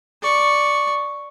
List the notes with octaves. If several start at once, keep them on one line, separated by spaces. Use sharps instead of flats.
D5 C#6